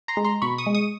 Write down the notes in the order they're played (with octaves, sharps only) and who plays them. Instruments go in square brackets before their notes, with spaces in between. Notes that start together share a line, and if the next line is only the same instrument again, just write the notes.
[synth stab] A#5 C6
G#3
A#5 C6
B2 B5 C#6
C#6 D#6
G#3
C#6 D#6